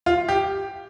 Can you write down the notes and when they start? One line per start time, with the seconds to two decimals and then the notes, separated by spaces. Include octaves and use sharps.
0.06 F4
0.28 G4